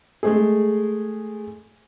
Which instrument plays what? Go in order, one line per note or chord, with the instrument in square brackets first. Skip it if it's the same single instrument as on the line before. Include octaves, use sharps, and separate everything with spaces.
[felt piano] G#3 A3 G#4